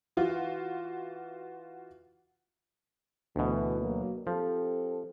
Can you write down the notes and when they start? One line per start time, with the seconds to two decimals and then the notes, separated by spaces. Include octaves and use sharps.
0.17 E3 F4 F#4
3.36 D2 B2 E3
3.80 F#3 A#3
4.27 F3 C4 G4 A4